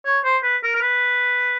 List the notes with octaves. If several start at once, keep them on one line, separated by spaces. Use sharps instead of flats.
C#5
C5
B4
A#4
A#4
B4